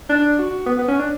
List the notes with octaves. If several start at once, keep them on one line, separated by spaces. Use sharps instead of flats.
D4
F#4
B3
B3
C#4
D4